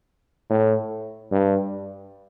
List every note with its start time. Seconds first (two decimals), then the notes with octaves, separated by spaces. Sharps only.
0.50 A2
1.32 G2